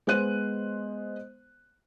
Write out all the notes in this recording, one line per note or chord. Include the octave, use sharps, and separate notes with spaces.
G#3 B3 C5 F#6 D#7